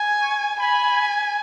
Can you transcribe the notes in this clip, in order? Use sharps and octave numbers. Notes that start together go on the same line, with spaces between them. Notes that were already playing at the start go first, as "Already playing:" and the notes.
Already playing: G#5
C#6
G#5 B5